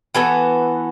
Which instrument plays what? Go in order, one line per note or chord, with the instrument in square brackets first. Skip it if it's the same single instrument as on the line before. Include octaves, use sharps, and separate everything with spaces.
[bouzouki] E3 B3 F#4 A4